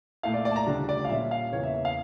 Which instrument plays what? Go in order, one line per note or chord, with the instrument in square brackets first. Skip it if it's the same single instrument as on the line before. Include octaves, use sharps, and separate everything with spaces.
[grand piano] A#2 A3 E4 F5
D5
D5
A5
A#5
D2 C#3 G3 D4 F4
D5
F5
A#2 G3 C#4 E5
F5
E2 C#3 E3 A#3 C#5
E5
E5
F5